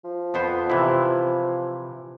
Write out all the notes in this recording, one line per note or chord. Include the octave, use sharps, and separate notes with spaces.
F3
F2 B3 C5
C3 E3 E4